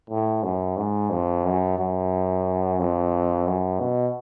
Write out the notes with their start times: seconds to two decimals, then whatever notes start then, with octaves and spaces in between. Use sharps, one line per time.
0.10 A2
0.43 F#2
0.77 G#2
1.11 F2
1.44 F#2
1.78 F#2
2.79 F2
3.47 F#2
3.80 B2